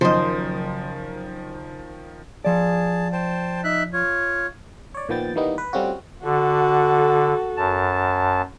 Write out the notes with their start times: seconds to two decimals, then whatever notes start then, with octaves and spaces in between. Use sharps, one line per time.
0.01 F#1 D#3 F3 C5 D#5
2.45 F3 G#4 D5 A5
3.12 C5 G5 A5
3.64 D#4 E5 F#6
3.93 F4 C#5
4.94 C#5 D5
5.09 A#2 D#3 F3 B3 G5 A6
5.36 D#3 E3 G3 A#3 B3 D#4
5.58 B4
5.73 G3 A3 C4 C#4 F4 F#4
6.23 D3 F#4 A4
7.57 F#2 A5